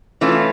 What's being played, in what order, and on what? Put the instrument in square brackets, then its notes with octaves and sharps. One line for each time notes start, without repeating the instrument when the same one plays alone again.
[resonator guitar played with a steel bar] E3 A3 C#4 F4